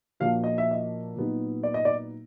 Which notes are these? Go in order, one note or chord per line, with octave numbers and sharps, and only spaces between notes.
A#2 F3 A#3 D4 F#4 F5
D#5
E5
D#5
A#2 F#3 B3 D#4
D5
D#5
D5